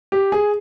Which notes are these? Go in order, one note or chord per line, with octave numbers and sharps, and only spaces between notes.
G4
G#4